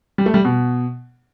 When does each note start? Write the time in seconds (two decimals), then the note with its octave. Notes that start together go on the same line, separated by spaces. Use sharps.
0.18 G3
0.26 A3
0.34 G3
0.44 B2